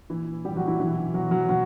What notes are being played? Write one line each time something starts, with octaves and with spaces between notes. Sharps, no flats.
A#2 E3 E4
A#2 G3 G4
F#3 F#4
E3 E4
B2 E3 E4
B2 F#3 F#4
F#3 F#4
B2 F#3 F#4